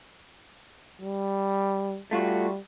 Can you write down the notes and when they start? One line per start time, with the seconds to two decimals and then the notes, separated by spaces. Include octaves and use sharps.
1.01 G3
2.11 G3 A3 F4 F#4